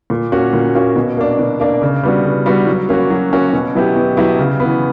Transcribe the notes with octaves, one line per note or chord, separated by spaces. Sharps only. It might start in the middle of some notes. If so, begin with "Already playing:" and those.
A#2
A#3 C#4 F#4
A#2
A#3 C#4 F#4
B2
A#3 D4
B2
A#3 D4
C#3
G3 B3 D4 F#4
C#3
G3 B3 D4 F#4
F#3
A#3 C#4 F#4
F#3
A#3 C#4 F#4
B2
F#3 B3 E4 G4
B2
F#3 B3 E4 G4
C#3
B3
E3